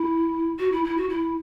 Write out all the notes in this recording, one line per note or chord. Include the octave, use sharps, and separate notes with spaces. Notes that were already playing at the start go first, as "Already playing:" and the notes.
Already playing: E4
F#4
E4
E4
F#4
E4